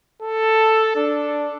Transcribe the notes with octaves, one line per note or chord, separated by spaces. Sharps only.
A4
D4